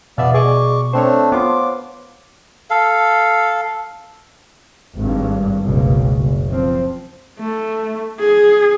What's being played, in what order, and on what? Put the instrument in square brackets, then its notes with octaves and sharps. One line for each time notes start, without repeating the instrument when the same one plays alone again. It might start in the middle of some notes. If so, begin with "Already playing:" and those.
[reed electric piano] E2 E5 F5 [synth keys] B2 [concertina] B3 D5
[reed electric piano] G#4 D5 D#5 [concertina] C#6 D6
[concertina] A3 C4 D4 [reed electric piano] C5 C#5
[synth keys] B3 F4 [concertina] D6
[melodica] A4 F5
[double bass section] G#1 G2
F#1 C#2 B2
F#1
F3 C4
[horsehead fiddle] A3
G#4